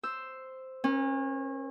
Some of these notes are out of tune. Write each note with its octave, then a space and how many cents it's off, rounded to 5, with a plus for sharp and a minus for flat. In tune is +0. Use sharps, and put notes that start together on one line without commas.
C5 +0 E6 +0
C#4 -35 A#4 +35